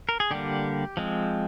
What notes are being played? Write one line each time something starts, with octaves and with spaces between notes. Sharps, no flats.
A#4
G#4
D3 G3 A#3 G4
F3 G#3 C4